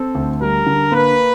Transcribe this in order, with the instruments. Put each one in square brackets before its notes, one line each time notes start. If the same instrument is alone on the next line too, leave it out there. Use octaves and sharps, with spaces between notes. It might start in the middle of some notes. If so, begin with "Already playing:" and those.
Already playing: [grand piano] C4 [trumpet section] A4
[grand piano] D2
[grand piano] G3 [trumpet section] A#4
[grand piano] D3
[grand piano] A#3 [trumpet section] B4